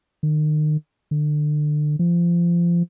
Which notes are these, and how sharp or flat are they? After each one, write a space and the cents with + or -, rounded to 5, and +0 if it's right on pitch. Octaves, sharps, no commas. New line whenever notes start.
D#3 -35
D3 +30
F3 -25